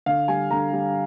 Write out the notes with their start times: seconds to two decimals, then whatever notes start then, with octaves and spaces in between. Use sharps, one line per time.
0.06 D3 F5
0.28 G3 G#5
0.51 D3 A#5
0.73 G3